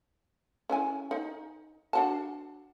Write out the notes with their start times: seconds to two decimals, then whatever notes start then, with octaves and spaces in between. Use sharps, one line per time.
0.70 C#4 E4 G#5
1.11 D#4
1.93 D4 F#4 A5